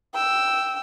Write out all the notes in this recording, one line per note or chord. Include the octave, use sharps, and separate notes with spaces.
G5 E6